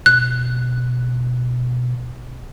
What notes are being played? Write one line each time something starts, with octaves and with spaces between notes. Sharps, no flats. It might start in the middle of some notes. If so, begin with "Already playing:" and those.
B2 F#6